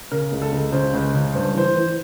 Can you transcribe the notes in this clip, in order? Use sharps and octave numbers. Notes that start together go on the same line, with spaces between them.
C#3 A#4
C#2
A4
C#2
C#3 C5
C#2
C#3
G2 C5
E3 C5
E3